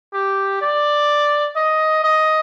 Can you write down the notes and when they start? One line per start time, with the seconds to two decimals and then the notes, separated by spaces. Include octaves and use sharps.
0.13 G4
0.62 D5
1.56 D#5
2.04 D#5